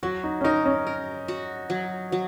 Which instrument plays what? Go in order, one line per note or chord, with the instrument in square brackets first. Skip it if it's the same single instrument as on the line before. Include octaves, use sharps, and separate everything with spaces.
[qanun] F#3 [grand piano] F#4
[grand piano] D#4
C#4
[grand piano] D#4 [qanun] A#4
[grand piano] C#4
[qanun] A#4
F#4
F#3
F#3